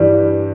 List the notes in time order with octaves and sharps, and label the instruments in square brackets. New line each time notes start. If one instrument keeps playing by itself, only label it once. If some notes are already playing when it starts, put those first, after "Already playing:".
Already playing: [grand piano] G2 E3 G3